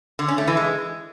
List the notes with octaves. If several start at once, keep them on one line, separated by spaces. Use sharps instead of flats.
D3
C#4
A3
E3
G#3